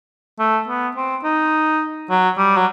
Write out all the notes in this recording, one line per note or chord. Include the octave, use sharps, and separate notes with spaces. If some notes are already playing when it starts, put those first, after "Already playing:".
A3
B3
C4
D#4
F#3
G3
F#3